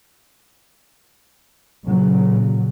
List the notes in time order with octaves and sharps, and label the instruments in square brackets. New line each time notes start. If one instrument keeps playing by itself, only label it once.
[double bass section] A#2 C#3 F#3